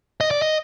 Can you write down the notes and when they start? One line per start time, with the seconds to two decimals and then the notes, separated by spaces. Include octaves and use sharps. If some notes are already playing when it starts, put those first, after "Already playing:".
0.21 D#5
0.31 D5
0.42 D#5